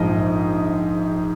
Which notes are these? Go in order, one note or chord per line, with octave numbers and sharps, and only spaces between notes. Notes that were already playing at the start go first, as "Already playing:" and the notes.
Already playing: A#1 G#2 F3 D#5